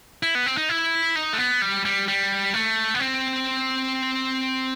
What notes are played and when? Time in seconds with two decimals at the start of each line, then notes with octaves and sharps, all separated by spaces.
0.23 E4
0.35 B3
0.46 C4
0.57 D#4
0.69 E4
1.16 D#4
1.33 A3
1.38 B3
1.62 G3
1.85 G3
2.08 G3
2.54 A3
2.94 B3
3.00 C4